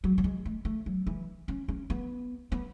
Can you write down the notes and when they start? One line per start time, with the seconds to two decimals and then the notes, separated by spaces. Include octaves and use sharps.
0.04 F#3
0.18 F#3
0.24 G#3
0.45 A3
0.65 A3
0.86 F#3
1.07 E3
1.48 C#4
1.68 C#4
1.90 B3
2.52 B3